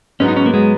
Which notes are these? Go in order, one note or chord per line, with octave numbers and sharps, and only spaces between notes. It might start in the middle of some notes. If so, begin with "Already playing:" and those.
G#2 F#3 B3 C#4
D#4
C#4
A#3
F#3 G#3 B3